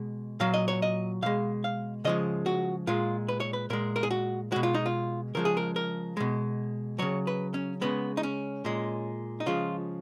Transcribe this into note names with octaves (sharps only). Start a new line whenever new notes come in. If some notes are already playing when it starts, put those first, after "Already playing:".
Already playing: B2 G#3
A#2 F#3 F5
D#5
C#5
D#5
B2 G#3 F5
F5
C#3 F3 G#3 D#5
F#4
A#2 G#3 F4
B4
C#5
B4
A#2 G#3 A#4
A#4
G#4
F#4
B2 G#3 F#4
F4
D#4
F4
C#3 F3 G#3 A#4
G#4
A#4
A#4
B2 G#3
C#3 F#3 C#5
B4
C#4
C#3 G#3 B3
D#4
C#4
A#2 G#3
D#4
C#3 F3 G#3 F4